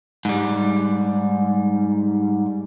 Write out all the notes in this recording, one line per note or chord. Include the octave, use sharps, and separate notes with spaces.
G#2 G3